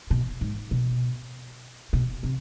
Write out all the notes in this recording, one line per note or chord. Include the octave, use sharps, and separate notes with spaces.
B2
G#2
B2
B2
C3